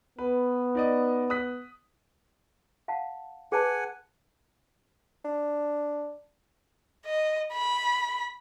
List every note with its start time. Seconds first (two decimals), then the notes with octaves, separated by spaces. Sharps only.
0.19 B3 B4
0.75 D#4 D5 D#5
1.30 D#6 F#6 B6
2.88 F5 F#5 A5
3.52 G#4 B4 F#5 G#5 A5
5.24 D4
7.06 D#5
7.53 B5